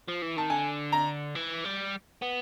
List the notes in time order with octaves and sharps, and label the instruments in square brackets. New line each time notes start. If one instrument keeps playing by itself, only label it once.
[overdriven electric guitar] F3
E3
[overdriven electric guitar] D#3 [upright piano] A5
[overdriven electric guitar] D3 [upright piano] G#5
[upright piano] A#5
[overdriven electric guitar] E3
G3
B3